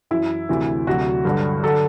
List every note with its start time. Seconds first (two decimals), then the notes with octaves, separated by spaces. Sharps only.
0.11 F#2 E3 E4
0.49 D2 C3 E3
0.87 D2 C3 F#3 F#4
1.25 G2 D3 F#3
1.63 D3 F#3 A4